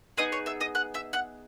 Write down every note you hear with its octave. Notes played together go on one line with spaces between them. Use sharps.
B3 D#4 G#4 D#5 D#6
C#5 C#6
E5 E6
D#5 D#6
F#5 F#6
E5 E6
F#5 F#6